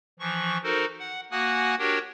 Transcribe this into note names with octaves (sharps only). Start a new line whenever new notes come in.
E3 F3 C#6
D#4 F#4 A4 A#4 C5
F#5
A#3 F#4 F#5 G#5 D#6 F#6
D4 F#4 G4 A#4 C#5 G5